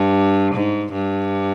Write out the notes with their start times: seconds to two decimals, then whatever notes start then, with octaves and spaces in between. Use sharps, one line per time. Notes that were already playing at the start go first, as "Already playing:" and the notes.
Already playing: G2
0.54 G#2
0.92 G2